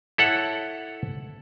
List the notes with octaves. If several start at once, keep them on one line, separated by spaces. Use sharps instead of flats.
E4 A4 C#5 F#5